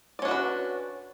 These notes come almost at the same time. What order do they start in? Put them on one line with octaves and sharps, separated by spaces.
D5 C#4 D4 F#4 B4